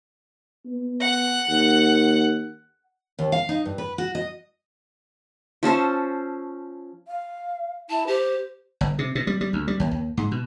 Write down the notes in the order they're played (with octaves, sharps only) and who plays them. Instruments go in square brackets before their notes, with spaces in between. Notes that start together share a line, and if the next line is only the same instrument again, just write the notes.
[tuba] B3
[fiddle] F#5
[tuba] D#2
[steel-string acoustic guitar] D#2
F5
D#4
G2
B4
F#4
D#5
[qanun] F3 C#4 A4 C5
[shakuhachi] F5
[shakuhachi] E4 [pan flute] A5
[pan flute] G4 [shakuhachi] C5
[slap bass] G1
C3
B2
G3
G3
D2
G3
D#2
D#2
G#2
B2